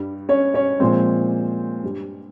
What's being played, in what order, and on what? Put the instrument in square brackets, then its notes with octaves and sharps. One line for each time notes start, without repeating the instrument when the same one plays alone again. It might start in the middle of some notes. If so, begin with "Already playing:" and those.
Already playing: [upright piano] G2 G3
C#4 C#5
C#4 C#5
A#2 F3 G#3 C4 C5
G2 G3